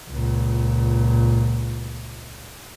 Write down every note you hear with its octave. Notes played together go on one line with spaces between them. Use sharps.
C#2 A#2